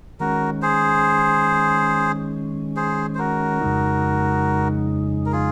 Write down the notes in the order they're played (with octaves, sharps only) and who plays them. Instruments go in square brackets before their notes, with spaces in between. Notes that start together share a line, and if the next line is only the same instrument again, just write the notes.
[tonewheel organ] D#3 G#3 C#4 [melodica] F#4 A#4
[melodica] G#4 C5
G#4 C5
C5
F#4 A#4
[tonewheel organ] F2 C#3 G#3 D#4
[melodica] A#4
F4 G#4